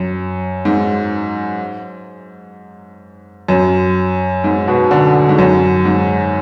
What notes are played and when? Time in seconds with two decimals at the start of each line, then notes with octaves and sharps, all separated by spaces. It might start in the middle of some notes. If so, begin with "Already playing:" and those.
Already playing: F#2
0.65 G#2
3.48 F#2
4.44 G#2
4.68 B2
4.91 D3
5.29 G#2
5.38 F#2
5.85 G#2